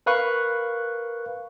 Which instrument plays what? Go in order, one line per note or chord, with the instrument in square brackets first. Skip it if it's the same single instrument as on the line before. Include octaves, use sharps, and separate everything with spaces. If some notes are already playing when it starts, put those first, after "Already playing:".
[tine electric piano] A#4 B4 F5 C#6 F#6